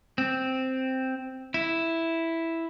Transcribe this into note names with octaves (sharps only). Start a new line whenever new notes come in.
C4
E4